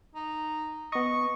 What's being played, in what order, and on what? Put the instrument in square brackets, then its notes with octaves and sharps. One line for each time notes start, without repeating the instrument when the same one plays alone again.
[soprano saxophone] D#4
[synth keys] B3 D#5 [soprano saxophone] C#6